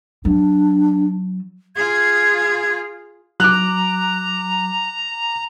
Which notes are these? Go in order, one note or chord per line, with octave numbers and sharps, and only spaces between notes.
F#3 D4
F4 G#4 G#6
F#3 A#5 D6 F#6